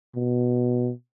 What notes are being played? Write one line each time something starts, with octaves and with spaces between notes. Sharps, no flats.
B2